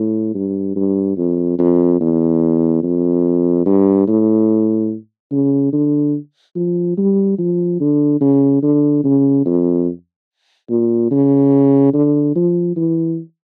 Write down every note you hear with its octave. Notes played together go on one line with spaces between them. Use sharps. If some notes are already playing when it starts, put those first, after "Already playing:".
Already playing: A2
G2
G2
F2
F2
E2
F2
G2
A2
C#3
D3
F3
G3
F3
D3
C#3
D3
C#3
F2
A#2
C#3
D3
F3
E3